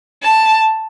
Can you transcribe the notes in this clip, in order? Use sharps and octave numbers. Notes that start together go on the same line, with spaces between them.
A5